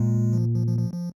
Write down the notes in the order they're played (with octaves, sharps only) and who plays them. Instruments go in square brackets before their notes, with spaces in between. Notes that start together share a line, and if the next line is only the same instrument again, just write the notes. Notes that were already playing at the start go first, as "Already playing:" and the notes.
Already playing: [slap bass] A#2 A#3 [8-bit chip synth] G#3
[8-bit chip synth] F3
F3
F3
F3
F3